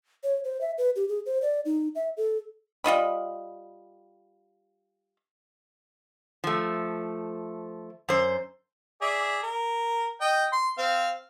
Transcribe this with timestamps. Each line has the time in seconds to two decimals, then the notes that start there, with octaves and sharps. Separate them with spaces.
0.23 C#5
0.44 C5
0.61 E5
0.78 B4
0.96 G4
1.09 G#4
1.26 C5
1.42 D5
1.65 D#4
1.95 E5
2.17 A4
2.84 G3 F4 D#5 B5
6.44 F3 A3
8.09 F#2 C5
9.02 G#4 D5 E5
9.43 A#4
10.21 D#5 G5
10.53 C6
10.78 C4 F5